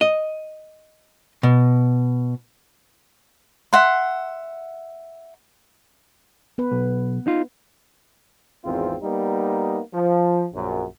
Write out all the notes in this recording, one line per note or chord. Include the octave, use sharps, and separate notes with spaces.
D#5
B2
E5 F#5 C6
B3 B4
B1
D#4 F4
G#1 E2 C4 F4
G3 A#3 B3 D#4
F3
A#1 F#2